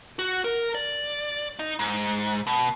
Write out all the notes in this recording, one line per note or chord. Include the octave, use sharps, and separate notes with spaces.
F#4
A#4
D5
D#4
G#2
B2